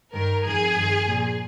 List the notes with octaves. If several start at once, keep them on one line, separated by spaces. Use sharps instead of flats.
G2 D#3 A#4
F2 D#3 G#4
G2 D#3
A#2 F3